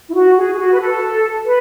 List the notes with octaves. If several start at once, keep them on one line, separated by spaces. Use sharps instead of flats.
E4
F#4
G#4
G#4
F#4
B4
A4
B4